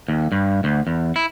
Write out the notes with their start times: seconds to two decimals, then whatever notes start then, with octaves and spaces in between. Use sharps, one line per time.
0.08 D#2
0.32 G2
0.64 D2
0.87 E2
1.16 E4